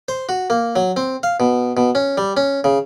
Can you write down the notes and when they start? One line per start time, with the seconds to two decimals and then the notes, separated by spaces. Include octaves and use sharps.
0.08 C5
0.29 F#4
0.50 A#3
0.76 F#3
0.97 C4
1.23 F5
1.40 B2
1.77 B2
1.95 C#4
2.18 G3
2.37 C#4
2.64 C#3